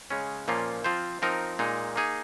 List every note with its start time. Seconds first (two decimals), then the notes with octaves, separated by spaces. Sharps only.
0.10 C#3 G#3 C#4
0.48 A#2 F3 A#3 C#4 F4
0.84 F3 C4 F4 C5
1.22 F3 C4 D#4 A#4
1.59 A#2 G#3 D#4
1.96 A#3 D#4 G#4